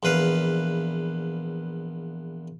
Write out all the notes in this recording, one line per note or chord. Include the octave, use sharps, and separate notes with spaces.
A#1 E2 B4 F5